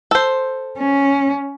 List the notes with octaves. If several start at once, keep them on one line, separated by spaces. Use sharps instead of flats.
A4 C5
C#4